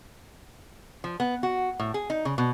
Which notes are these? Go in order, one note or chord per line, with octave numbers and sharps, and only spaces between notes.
F3
B3
F#4
A2
G#4
D#4
C#3
B2